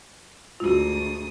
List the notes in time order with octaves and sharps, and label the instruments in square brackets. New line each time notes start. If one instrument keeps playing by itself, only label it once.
[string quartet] D2 G#2 D#6 [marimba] F4 F#4